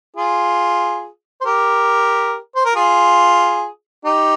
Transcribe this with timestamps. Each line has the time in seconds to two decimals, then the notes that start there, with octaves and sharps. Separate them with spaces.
0.16 F4 G#4
1.41 C5
1.45 G4 A#4
2.56 C5
2.65 A#4
2.75 F4 G#4
4.05 D#4 G4